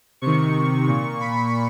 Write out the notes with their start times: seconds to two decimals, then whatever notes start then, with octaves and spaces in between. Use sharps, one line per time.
0.22 C3 D#3 C#6
0.88 A#2
1.21 B5